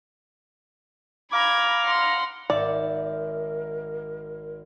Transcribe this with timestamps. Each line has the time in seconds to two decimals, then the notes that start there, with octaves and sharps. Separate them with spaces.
1.32 F5 A#5 B5 D6 G#6
1.84 F#5 C6
2.50 G#1 A#4 C#5 D5 E5